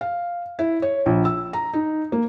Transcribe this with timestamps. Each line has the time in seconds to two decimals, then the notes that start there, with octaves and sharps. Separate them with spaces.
0.01 F5
0.59 E4
0.82 C#5
1.06 A#1
1.25 E6
1.53 A#5
1.74 D#4
2.12 A#3